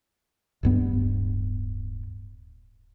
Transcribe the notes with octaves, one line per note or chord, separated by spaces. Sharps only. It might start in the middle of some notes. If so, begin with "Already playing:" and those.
D1 G2 B3